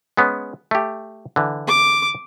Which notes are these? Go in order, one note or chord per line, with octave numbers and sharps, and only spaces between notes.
G#3 B3 C#4
A3 G4
D3 E3
D6